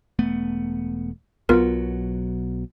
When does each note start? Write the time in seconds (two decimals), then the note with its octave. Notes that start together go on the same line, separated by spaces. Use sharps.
0.19 E1 A3 B3
1.49 B1 B2 F#3 B3 F4 A#4